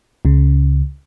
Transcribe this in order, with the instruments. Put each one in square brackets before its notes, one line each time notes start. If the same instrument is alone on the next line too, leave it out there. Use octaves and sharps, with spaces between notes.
[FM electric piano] C#2 C#3